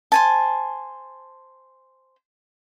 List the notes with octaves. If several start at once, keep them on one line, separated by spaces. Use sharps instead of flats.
C5 G#5 A5